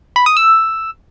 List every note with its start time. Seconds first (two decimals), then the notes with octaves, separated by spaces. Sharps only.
0.16 B5
0.26 D#6
0.37 E6